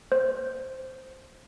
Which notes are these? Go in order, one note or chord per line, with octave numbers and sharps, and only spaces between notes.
C5